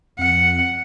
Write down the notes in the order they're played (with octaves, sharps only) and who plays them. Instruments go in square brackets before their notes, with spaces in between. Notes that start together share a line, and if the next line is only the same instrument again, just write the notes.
[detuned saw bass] F2 [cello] F#5